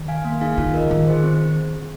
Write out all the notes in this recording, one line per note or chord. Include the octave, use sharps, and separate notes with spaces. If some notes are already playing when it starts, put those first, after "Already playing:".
Already playing: D#3
F5 G#5
A#3
D#4 G#4 F5 G#5
D#3 F4
A#4 D#5
D#3 F4
G#4 C5
C4